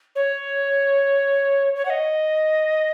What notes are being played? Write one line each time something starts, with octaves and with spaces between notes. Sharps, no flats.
C#5
C#5
F#5
D#5